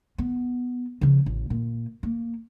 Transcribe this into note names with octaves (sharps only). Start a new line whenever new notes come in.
B3
C#3 F3
A1
A#2
A#3